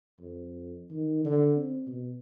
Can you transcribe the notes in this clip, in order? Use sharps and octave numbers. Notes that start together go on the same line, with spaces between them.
F2
D#3
D3
C4
B2